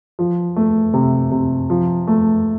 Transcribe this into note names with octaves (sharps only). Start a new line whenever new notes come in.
F3
A3
C3
C3
F3
A3